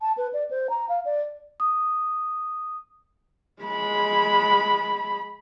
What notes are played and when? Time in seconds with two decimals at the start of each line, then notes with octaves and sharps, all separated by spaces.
0.02 A5
0.17 B4
0.33 D5
0.51 C5
0.70 A#5
0.89 F5
1.05 D5
1.60 D#6
3.62 G#3 B5